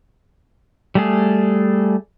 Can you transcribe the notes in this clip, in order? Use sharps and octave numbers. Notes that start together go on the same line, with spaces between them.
G3 A3 G#4